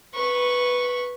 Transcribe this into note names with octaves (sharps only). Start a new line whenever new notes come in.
B4 C#6